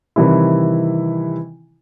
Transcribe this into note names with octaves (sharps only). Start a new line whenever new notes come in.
C3 D#3 E3 G3 E4